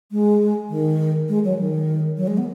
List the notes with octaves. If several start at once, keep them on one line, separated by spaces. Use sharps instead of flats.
G#3
D#3
G#3
F#3
D#3
F#3
G#3
B3